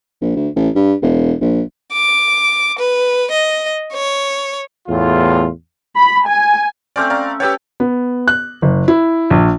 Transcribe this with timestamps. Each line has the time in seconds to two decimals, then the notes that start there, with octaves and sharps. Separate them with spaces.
0.21 A#1
0.36 D2
0.56 A1
0.75 G2
1.02 E1
1.41 A#1
1.92 D6
2.79 B4
3.31 D#5
3.93 C#5
4.88 E2 A2 F4
5.97 B5
6.27 G#5
6.96 A3 C4 C#4 D5 D6 F6
7.10 C#4 D5 F5 A#5
7.40 G4 B4 C#5 G5 A5 E6
7.80 B3
8.28 F#6
8.62 F#1
8.88 E4
9.30 A#1